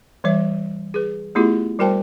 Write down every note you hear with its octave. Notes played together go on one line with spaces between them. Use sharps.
E3 G3 C#5 E5
G#4 B4
A3 B3 E4 F4 G4 G#4
G3 F#4 A#4 C5 G5 A5